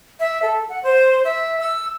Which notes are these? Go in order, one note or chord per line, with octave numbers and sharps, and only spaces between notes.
E5
A4
F#5
C5
E5
E6